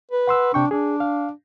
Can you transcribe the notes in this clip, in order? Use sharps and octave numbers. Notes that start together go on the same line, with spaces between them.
B4
F#5 C6 E6
C3 D4 G5 C#6
D4 G#4
F5